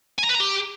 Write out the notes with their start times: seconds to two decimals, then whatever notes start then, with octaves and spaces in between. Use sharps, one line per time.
0.19 G#5
0.24 A#5
0.30 B4
0.35 A#5
0.40 G4